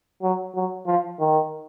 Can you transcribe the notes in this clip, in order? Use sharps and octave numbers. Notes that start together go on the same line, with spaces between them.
F#3
F#3
F3
D#3